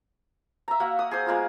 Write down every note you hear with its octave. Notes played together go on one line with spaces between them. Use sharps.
E5 A#5
A#3 F#4 F#5
D#6
G#4 C5 D#6
G#3 A#3 B3 F4